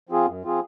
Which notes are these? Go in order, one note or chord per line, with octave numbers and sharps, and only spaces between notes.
F3 C4 F4 G#4
F#2
F3 C4 F4 G#4